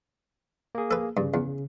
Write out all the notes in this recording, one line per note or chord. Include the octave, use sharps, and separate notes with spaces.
A#3 G#4
A4 B4
G2 C#3
E2